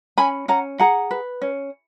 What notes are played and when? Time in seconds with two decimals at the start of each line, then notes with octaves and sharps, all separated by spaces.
0.18 C#4 G#5 B5
0.48 C#4 F#5 A#5
0.79 G#4 F#5 A#5
1.11 B4
1.42 C#4